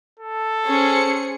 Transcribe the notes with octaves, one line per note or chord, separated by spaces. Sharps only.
A4
C#4 G#4 C5 C#7